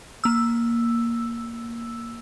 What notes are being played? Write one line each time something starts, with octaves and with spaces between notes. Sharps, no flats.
A#3 E6